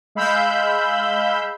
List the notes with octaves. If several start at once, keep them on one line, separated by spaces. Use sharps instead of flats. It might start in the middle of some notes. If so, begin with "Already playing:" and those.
G#3 F5 B5 E6 G6